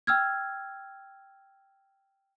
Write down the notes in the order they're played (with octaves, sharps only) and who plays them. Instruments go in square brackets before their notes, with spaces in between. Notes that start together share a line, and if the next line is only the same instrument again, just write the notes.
[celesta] G5 E6 F6 G#6